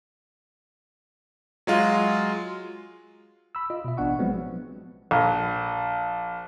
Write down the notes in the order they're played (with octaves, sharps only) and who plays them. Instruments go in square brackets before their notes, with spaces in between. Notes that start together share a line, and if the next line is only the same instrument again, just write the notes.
[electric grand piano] F#3 G#3 F4
[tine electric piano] B5 E6
F4 D#5
B2 E5
A1 B3 D4 F#5 C#6
F3 F#3 G#3 B3 C4
[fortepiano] A#1